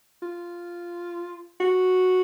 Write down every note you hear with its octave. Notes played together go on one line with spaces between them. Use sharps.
F4
F#4